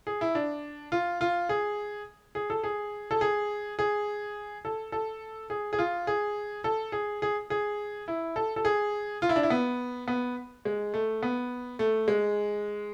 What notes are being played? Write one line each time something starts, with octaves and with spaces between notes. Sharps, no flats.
G#4
E4
D4
F4
F4
G#4
G#4
A4
G#4
A4
G#4
G#4
A4
A4
G#4
G#4
F4
G#4
A4
G#4
G#4
G#4
E4
A4
A4
G#4
F4
E4
D4
E4
B3
B3
G#3
A3
B3
A3
G#3